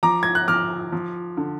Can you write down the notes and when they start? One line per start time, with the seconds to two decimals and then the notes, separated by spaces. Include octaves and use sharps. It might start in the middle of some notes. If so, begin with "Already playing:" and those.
0.03 F3 A#5 D6
0.23 G#6
0.35 F#6
0.48 F3 D6 F6
0.92 F3
1.37 D3